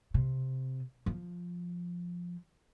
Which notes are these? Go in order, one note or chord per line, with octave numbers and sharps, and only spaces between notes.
C3
F3